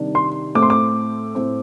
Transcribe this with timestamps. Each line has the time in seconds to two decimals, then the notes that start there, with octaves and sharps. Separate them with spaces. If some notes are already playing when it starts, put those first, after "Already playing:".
Already playing: C3 D#3 G3 D4
0.15 C6
0.55 A2 A3 C4 D6
0.62 C6
0.70 D6
1.35 A2 A3 C4